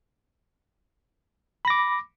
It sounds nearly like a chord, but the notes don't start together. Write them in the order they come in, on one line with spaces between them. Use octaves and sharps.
B5 A#6 D6